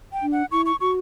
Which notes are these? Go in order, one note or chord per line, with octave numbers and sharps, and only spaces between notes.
G5
D4
F#5
E4 C#6
C#6
F#4 C#6